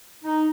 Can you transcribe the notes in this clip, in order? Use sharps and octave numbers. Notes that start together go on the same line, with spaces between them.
D#4